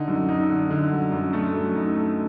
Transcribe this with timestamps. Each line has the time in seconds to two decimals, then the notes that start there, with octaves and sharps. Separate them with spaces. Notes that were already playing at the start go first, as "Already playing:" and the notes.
Already playing: D3 D#4
0.08 F#2
0.29 D#4
0.50 D3
0.71 D3
0.92 F#2
1.12 F#2
1.33 A3
1.54 F#2
1.75 D#4
1.96 A3